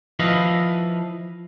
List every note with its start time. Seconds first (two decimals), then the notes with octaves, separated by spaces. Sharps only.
0.19 F3 E4 B4 D#5 F5